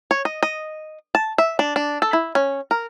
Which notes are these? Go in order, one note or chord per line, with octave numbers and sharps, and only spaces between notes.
C#5
D#5
D#5
A5
E5
D4
D4
A4
E4
C#4
A#4